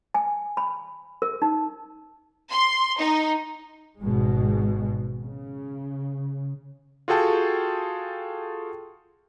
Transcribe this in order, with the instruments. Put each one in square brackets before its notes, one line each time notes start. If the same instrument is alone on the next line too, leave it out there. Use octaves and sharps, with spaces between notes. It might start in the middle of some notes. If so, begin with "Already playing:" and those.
[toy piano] G#5
B5
A#4
D#4
[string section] C6
D#4
[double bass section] G#1 B2 G#3
C#3
[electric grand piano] F4 F#4 G#4 A4 G5 A5